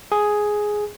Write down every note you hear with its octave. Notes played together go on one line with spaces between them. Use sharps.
G#4